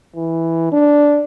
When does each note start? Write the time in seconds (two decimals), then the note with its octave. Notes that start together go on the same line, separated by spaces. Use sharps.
0.16 E3
0.72 D4